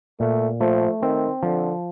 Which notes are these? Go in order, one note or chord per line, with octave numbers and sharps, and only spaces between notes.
A#2 A3
F3 A3
D#3 C4
D3 F3